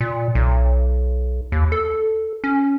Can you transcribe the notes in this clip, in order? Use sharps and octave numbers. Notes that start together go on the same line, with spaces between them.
A#2
B1
D#2
A4
C#4